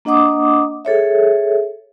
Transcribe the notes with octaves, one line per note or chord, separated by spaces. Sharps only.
A#3 D4 D#5 F#5 D6 D#6
G#4 A4 C#5 E5